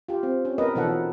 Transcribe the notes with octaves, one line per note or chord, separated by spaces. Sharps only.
F4 G4
C4
C#4
B3 A#4 B4 D#5
B2 E3 F3 D#4 A4 F#5